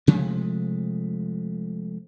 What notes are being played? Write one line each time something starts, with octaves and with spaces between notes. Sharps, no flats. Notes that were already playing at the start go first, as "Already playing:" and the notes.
C3 F3 G#3 A3